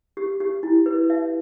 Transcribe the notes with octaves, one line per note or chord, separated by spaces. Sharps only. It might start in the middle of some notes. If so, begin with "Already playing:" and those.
G4
G4
E4
B4
E5